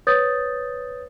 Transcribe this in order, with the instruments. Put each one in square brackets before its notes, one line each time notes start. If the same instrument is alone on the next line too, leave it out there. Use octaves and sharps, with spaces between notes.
[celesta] B4 C#5 D#6 G6 A6